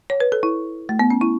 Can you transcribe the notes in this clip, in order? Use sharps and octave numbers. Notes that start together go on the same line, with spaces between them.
C#5
B4
A4
E4
A3
B3
C#4
E4